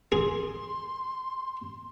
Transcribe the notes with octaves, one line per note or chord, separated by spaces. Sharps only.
G#4 C6